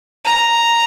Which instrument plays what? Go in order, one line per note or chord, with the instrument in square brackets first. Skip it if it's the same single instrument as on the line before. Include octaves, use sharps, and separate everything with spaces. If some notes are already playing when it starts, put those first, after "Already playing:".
[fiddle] A#5